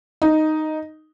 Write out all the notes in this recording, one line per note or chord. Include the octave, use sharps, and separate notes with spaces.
D#4